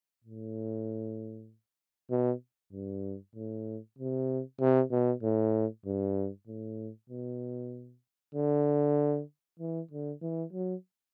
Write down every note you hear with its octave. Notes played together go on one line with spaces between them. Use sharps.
A2
B2
G2
A2
C3
C3
B2
A2
G2
A2
B2
D3
E3
D3
E3
F#3